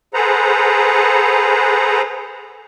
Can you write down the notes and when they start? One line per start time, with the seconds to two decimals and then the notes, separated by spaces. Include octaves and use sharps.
0.14 G#4 A4 B4 C5 F#5 A#5